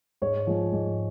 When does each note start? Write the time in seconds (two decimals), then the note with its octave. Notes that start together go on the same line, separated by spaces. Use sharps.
0.22 G#2 C#5
0.47 F3 G#3
0.72 G#2